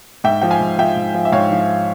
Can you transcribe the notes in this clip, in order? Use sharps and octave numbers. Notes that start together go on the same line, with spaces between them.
G#2 E5 G5
F3 G5
F5 G#5
G#2
F3 E5 G5
G#2
F3
E5
G#2 C#5 F5
F3